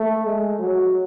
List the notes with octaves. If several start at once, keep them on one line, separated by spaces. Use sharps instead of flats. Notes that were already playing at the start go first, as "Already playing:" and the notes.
Already playing: A3
G#3
F#3